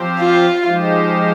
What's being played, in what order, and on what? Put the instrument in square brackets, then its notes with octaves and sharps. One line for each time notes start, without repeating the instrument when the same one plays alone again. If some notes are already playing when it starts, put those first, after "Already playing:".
Already playing: [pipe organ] F3 C4 G4 C5
[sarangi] F4
[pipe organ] F3 G#3 D#4 G4 C5